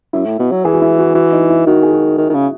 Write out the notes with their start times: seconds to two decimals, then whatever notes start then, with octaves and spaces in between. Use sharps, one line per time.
0.13 F#2 E4
0.25 A2
0.39 B2
0.52 F#3
0.65 E3 G#4
0.73 F#4
0.82 E4
0.99 F#4
1.15 E3 F#4
1.32 D#4
1.50 E4
1.66 D#3 F#4
1.83 G#4
1.92 F#4
2.18 D#3
2.30 D#3
2.34 C#3